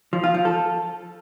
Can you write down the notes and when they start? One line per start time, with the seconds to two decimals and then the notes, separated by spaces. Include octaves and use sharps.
0.13 F3
0.24 F4
0.34 F3
0.45 A4